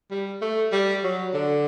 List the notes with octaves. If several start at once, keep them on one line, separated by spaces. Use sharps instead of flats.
G3
A3
G3
F#3
D3